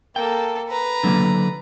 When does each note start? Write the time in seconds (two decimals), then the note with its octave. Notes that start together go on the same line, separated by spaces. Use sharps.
0.16 A#3 A4 G5
0.70 B4 A#5
1.04 D3 F#3 A#3